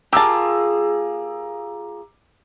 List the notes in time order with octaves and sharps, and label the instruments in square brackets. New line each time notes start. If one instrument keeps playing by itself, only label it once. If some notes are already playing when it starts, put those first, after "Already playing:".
[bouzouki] A#3 F4 G#4 [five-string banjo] G4 A5 [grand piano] A#5 D6 E6